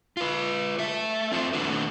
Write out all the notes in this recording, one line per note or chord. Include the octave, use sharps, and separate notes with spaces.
F4 B4
A3 E5
C4 F4 A4 C5
D#3 A3 D4 F#4 A4 B4